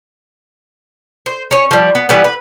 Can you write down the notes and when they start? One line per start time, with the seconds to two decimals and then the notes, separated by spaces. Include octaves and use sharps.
1.26 C5
1.51 C#4 C#5
1.71 F3 G3
1.95 B3
2.09 E3 G3 B3
2.24 B4